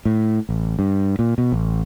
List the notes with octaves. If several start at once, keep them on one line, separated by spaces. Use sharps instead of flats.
A2
A1
G2
A#2
B2
A1